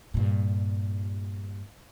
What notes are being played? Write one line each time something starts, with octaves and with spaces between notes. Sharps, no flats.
G2 A#2